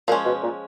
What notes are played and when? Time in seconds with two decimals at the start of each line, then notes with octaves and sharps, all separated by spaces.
0.08 A#2 F3 G#3 C#4
0.25 B2
0.42 A#2